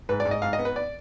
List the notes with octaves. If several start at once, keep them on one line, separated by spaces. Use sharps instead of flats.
G#2 B4
D5
G#2
D#5
G#2 F5
D#5
B3
B4
D5